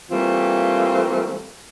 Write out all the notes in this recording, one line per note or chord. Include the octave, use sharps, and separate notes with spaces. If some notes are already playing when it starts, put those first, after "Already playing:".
E3 G3 A3 A#3 C4 F4